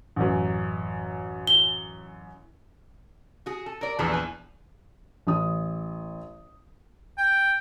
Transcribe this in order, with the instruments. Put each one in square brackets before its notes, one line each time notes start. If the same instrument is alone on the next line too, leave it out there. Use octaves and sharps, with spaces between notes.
[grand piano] A1 F#2
[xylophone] G7
[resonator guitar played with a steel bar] F#4 G#4
A4
A#4 D5
[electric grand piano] A#1 E2 [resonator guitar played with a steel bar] A3 G#4 A4
[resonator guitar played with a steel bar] B4 G#5
[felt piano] A1 D#6
[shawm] G5